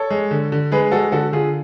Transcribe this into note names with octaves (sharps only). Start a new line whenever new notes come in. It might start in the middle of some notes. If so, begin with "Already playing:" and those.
Already playing: A4 C#5
G#3
D3
D3
G#3 G#4 B4
G#3 F#4 A4
D3 F#4 A4
D3 F4 G#4